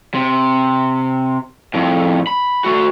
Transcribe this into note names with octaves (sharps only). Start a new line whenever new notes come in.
C3
F2 A2
B5
A3 F#4